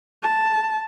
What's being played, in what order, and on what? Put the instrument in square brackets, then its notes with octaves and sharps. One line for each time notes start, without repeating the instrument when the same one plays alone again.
[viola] A5